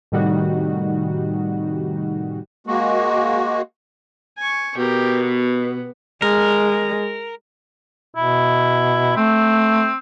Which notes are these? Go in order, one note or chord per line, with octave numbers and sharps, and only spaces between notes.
A2 C3 D#3 G3 D#4 F#4
G#3 A#3 F#4
G#5 C#6
B2 G4 A#4
B3
G#3 A#4
B2 E4
A3 C4